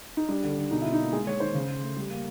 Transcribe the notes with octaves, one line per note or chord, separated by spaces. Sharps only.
D#4
G3 D4
D3
D3
B2 D#4
B2 E4
D#4
A#3
G#3 G#4
G#3 C#5
D#3 C5
C#3
C#3
A3
G3
A#3